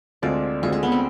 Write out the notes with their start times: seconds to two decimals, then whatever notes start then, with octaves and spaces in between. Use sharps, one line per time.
0.22 D2 D3 G#3 C4 F4 D5
0.62 D2 D3 G#3 C4 F4 G#4
0.73 G#4
0.83 B3
0.92 C4